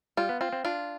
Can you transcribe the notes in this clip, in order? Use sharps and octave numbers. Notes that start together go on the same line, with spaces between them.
G3 F4
B3
C4 F4
C4
D4 F4